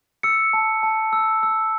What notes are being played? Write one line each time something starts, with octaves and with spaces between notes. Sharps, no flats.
E6 C#7
A5
A5
E6
E6